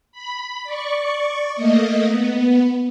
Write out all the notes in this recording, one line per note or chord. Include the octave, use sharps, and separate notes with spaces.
B5
D5 C#6
A3 A#3 D#5
B3